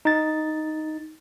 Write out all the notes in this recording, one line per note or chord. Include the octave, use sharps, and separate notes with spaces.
D#4 A6